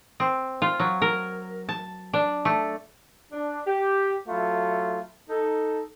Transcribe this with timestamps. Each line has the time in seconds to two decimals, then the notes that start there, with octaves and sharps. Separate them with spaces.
0.20 C4
0.62 F4
0.80 F#3
1.02 A#4
1.69 A5
2.13 D4
2.45 A3
3.32 D4
3.66 G4
4.28 F#3 A3 E4 F4 A4
5.29 D#4 A4